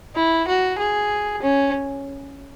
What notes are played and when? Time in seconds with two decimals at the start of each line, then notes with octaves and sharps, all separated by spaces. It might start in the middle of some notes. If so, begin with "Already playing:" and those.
0.16 E4
0.48 F#4
0.79 G#4
1.43 C#4